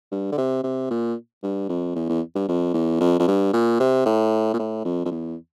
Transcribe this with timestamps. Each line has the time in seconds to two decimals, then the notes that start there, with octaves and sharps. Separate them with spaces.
0.12 G2
0.32 D3
0.38 C3
0.63 C3
0.91 A#2
1.43 G2
1.69 F2
1.95 E2
2.09 E2
2.35 G2
2.49 F2
2.74 E2
3.01 F2
3.19 F2
3.28 G2
3.54 A#2
3.80 C3
4.06 A2
4.53 A#2
4.59 A2
4.85 F2
5.05 F2
5.11 E2